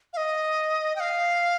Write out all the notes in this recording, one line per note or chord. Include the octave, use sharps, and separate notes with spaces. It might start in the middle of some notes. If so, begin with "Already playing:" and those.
F5
D#5
G5
F5